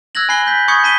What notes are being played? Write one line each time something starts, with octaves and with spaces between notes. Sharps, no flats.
E6 F#6 G#6 A#6 F#7
G#5 B5 E6 F#6 C7 G7
G6 B6
B5 C#6 D#6 G6 G#6 C#7
A5 B6 D#7 G7